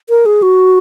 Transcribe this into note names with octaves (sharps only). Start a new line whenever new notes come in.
A#4
G#4
F#4